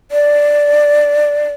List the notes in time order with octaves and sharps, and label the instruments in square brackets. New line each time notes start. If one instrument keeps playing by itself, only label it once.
[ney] D5